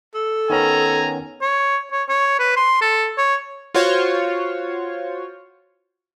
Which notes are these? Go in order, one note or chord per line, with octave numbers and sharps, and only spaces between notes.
A4
D#3 B3 C#4 G#5 A#5
C#5
C#5
C#5
B4
C6
A4
C#5
F4 F#4 C5 C#5